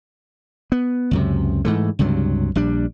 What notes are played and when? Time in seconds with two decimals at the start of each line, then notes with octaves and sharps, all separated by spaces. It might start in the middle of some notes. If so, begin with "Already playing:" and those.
0.72 B3
1.11 C#2 F#2 C3
1.65 G#2 E3 A3
1.99 C#2 G2 C3 F#3
2.55 A#1 G3 D4